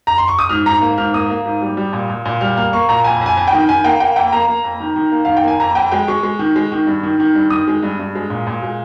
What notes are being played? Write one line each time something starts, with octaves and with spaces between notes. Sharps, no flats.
A#5
C6
C#6
D#6
G#2 F6
G#2 A#5
A#3
G#2 F6
A#3 D#6
A#3
G#2
G3
G3
A#2
A#2
A#2
G3 F6
A#3 F6
A#3 C#6
A#2 A#5
F2 G#5
F2 G#5
F2
G5
D#3
D#3 G#5
A#3 G5
A#3 G5
F2 G5
A#3 A#5
A#3
F2
D#3
D#3
A#3
D#3 F5
G5
A#3 G#5
F2 A#5
F2 G5
G#3 G5
G#3 C#6
G#3
D#3
G#3
D#3
G2
D#3
D#3
G2
D#3 D#6
G#3
G2
G2
G#3
A#2
A#2
G#3